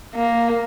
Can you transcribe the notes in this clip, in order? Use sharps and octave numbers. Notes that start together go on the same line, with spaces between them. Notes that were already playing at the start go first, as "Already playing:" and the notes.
A#3